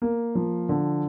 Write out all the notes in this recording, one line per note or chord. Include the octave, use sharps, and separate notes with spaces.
A#3
F3
D3